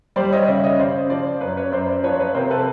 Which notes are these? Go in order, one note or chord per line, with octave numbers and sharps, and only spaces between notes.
G3 C5 D5
C#5 D#5
C#3 D5 E5
C#5 D#5
C#3 C5 D5
F3 C5 D5
F#2 B4 C#5
B4 C#5
F#2 C5 D5
C5 D5
F3 B4 C#5
B4 C#5
C3 A#4 C5
A4 B4